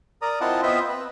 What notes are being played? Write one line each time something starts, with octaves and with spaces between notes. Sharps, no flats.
A#4 D5 A#5 D#6
C4 E4 F4 D#5 F#5 A5
B3 C4 F4 C5 D#5 E5
B4